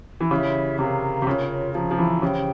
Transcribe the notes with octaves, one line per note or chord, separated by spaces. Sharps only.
E3
C#3 E4 G4 C#5 E5
C3 A#4 F5 A#5
C3
C#3 C#4 F4 A#4 C#5
F3 C5 F5 A#5
F3
E3
C#3 G4 C5 G5